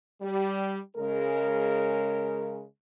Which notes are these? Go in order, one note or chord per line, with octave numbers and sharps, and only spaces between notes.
G3
C#3 G#3 A#4